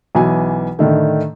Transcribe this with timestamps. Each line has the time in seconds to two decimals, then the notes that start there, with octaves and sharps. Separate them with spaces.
0.15 B1 E3 G#5
0.79 A2 D3 D#3 A3